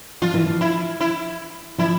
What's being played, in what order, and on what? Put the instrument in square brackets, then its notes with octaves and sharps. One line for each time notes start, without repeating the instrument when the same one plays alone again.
[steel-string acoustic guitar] F3 [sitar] F4
[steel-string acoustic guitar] E3
F3
[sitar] E4
E4
[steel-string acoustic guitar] F3 [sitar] E4